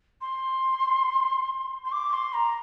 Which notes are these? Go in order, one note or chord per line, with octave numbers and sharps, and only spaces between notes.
C6
C6
D6
C6
A#5